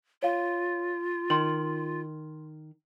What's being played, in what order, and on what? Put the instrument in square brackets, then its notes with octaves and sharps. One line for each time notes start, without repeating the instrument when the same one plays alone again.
[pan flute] F4 [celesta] C#5 F5
[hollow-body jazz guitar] D#3 [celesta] C6 F#7